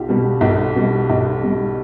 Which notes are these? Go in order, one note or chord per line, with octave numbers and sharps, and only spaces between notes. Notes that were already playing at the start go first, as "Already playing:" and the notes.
Already playing: B1 F4 G4
B2 G3
B1
B2 G3
B1
B2 G3